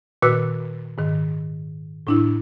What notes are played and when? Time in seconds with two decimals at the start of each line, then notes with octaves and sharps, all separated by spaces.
0.22 A#2 D#3 F#4 B4 E6 F#6
0.98 G#2 D#3
2.07 A2 D4 E4